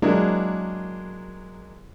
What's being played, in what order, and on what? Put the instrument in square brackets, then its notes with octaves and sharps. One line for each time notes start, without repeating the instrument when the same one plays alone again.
[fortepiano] F#3 G#3 A#3 D4 E4